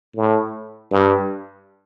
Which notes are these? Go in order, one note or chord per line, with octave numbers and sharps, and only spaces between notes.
A2
G2